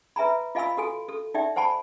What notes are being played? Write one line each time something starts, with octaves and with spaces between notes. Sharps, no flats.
B4 E5 G#5 A#5 B5
F4 D#5 F5 G#5 B5 E6
F#4 A4 G#5
A4
D#4 D5 E5 G5
C5 F#5 G#5 A5 B5